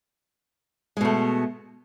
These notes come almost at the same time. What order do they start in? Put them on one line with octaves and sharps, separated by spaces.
G#3 B2 A3